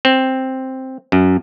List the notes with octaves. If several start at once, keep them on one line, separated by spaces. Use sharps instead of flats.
C4
F#2